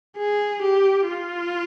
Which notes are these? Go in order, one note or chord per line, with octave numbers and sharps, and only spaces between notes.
G#4
G4
F4